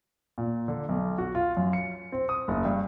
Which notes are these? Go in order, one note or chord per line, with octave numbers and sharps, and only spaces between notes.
A#2
D3
B1
F#4
F4
F#2
C#7
C4
D#6
F#1
G2